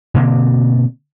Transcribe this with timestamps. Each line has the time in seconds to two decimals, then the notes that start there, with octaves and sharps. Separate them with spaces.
0.14 B2 D3 A#3 C4